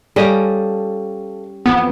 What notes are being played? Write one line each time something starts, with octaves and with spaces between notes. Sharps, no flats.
G3 C#4 G4 A4 D#5 F5
F2 E3 B3